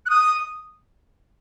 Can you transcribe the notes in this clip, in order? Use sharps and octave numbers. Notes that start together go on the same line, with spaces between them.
F#6
D#6